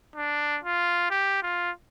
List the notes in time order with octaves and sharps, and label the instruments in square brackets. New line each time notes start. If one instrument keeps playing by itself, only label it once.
[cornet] D4
F4
G4
F4